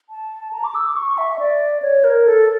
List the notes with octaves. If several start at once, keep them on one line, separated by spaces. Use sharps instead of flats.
A5
A#5
D6
E6
D6
C#6
E5
D5
C#5
A#4
A4